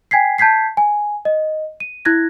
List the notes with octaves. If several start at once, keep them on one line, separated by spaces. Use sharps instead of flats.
G5 G#5 G#6 B6 C7
A5 G6 G#6 B6 C7
G#5
D#5
D#7
E4 F#6 G#6 A#6